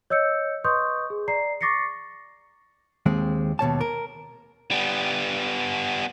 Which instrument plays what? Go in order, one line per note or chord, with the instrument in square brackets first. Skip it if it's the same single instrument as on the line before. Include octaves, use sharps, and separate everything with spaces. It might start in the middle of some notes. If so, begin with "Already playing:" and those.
[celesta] C#5 D#5 E6 G6 C#7
B4 D#5 C6 C#6 D#6 G6
G#4
D5 A#5 C7
C#6 D6 A6 A#6 C7 C#7
[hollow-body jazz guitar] D#2 G#3 C4
D#2 B2 C#5 A5
A#4
[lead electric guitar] G3 B3